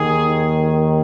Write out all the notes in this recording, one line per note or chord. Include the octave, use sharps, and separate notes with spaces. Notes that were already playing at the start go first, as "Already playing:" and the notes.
Already playing: D#2 D#3 G#4